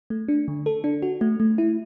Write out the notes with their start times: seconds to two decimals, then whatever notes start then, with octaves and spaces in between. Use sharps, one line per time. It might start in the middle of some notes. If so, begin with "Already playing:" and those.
0.10 A3
0.28 D4
0.48 D3
0.66 A4
0.84 D4
1.02 F#4
1.21 A3
1.40 A3
1.58 E4